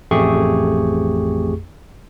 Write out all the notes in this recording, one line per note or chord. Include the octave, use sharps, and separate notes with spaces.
A1 F2 A3 G4 G#4 C#6